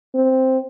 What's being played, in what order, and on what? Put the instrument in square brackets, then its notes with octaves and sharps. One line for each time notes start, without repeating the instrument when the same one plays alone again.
[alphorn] C4